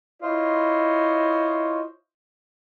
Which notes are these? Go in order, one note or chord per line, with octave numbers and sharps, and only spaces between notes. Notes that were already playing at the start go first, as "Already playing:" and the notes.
E4 F4 C5 C#5 D#5